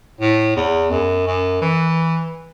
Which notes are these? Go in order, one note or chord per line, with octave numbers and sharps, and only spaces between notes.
A2
E2
F#2
F#2
E3